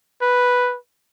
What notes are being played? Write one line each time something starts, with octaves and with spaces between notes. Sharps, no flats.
B4